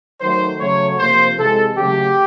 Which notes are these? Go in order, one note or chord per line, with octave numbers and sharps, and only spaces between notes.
D#3 F#3 A3 C5
C#3 F#3 A3 C#5
C3 F3 A#3 C5
C3 E3 G#3 A4
C#3 F#3 A3 G4